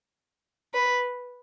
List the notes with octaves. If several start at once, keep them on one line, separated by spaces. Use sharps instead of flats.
B4